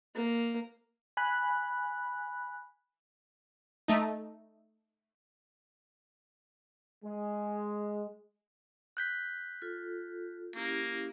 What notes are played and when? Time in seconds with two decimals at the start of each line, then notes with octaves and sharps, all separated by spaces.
0.15 A#3
1.17 G#5 B5 F#6
3.88 A3 D#4
7.05 G#3
8.97 F#6 G6 B6
9.62 F4 A4
10.56 A#3 C#4 E4 G4